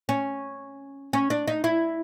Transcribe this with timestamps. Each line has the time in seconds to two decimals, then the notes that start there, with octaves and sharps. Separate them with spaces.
0.09 C#4
1.13 C#4
1.30 D4
1.48 D#4
1.64 E4